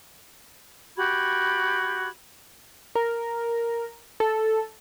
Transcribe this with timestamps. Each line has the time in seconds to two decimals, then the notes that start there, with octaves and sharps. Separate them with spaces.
0.96 F#4 G4 B5 G#6
2.95 A#4
4.20 A4